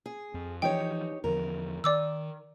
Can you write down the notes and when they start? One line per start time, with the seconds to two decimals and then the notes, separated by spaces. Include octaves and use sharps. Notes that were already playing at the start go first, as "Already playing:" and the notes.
0.06 G#4
0.34 F2
0.62 E3 F3 D#4 G4 C#5 G5
1.24 E2 D3 F3 A#4
1.84 D#3 D5 D6 E6